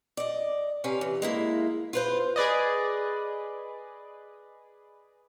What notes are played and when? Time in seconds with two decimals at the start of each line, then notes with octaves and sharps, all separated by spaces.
0.17 D5 D#5
0.84 C3 C#4 B4 F5
1.01 E3
1.22 G#3 A#3 E4
1.93 F4 B4 C5
2.36 G#4 B4 D5 D#5